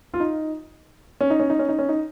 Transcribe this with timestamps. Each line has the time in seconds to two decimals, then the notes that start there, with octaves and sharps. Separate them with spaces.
0.14 F4
0.20 D#4
1.21 C#4
1.30 D#4
1.40 C#4
1.50 D#4
1.59 C#4
1.69 D#4
1.79 C#4
1.89 D#4